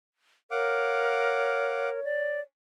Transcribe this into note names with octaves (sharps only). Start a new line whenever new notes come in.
A#4 C#5 F5 F#5 D6
D5